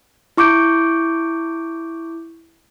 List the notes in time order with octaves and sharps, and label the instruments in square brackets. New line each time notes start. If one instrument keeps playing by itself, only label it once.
[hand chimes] E4 C#6 D6 G6 D7